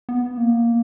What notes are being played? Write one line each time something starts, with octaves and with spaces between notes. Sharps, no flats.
B3
A#3